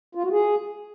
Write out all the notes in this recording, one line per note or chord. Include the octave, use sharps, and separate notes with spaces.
F4
F#4
G#4